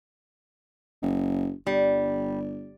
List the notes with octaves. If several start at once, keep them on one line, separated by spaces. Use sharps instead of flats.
F#1
G1 G3